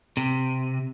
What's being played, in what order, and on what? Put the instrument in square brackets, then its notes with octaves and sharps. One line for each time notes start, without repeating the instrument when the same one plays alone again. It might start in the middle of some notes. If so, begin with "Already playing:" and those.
[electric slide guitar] C3